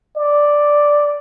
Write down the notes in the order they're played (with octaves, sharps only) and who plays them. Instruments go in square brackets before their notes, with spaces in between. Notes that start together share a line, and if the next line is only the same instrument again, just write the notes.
[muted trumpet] D5